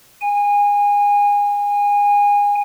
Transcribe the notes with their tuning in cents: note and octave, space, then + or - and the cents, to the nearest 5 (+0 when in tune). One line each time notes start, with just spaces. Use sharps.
G#5 -25